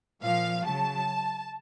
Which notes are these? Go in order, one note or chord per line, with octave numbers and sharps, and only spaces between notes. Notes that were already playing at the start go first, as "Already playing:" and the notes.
A#2 F3 F5
C#3 F#3 A5